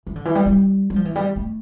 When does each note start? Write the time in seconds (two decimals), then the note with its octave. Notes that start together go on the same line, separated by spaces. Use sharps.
0.07 E3
0.16 D3
0.25 E3
0.35 G3
0.46 G3
0.90 G3
0.96 F3
1.05 E3
1.16 G3
1.36 A3